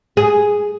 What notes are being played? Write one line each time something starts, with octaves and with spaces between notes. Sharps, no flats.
G#4